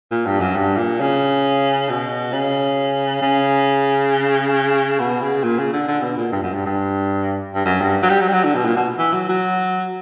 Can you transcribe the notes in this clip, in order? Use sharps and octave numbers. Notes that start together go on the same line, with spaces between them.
A#2
G2
F#2
G2
A#2
C#3
B2
C#3
C#3
B2
C#3
A#2
C#3
D3
D3
B2
A#2
G2
F#2
G2
G2
G2
F#2
G2
F#3
G3
F#3
G3
F#3
D3
B2
A#2
B2
E3
F#3
F#3